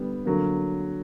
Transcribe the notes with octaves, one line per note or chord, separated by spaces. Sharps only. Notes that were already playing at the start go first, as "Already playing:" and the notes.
Already playing: D3 G3 B3
D3 F#3 A#3